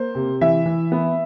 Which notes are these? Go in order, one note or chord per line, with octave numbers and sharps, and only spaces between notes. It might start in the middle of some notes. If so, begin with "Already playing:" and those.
Already playing: A#3 C5
C3
E3 E5
E3
B3